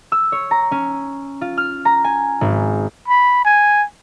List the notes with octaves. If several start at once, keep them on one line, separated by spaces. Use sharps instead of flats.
E6
C#5
A#5
C#4
F4
F6
A#5
G#5
G#1
B5
G#5